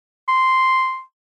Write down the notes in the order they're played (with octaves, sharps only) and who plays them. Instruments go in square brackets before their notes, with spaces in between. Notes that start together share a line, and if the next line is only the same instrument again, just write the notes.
[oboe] C6